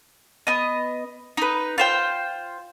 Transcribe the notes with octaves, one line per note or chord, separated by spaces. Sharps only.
B3 D#5
D#4 B4
F4 C5 G5